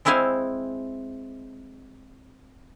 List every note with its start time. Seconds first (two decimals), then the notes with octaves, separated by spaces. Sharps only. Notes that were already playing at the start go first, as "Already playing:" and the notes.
0.05 G#3 C4 E4 C5 F5 G#5